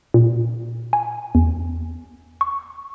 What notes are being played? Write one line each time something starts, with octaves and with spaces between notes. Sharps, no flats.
A#2
G#5
E2
C#6